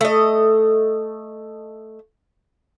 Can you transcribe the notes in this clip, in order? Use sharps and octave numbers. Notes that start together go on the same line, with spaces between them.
A3 D#5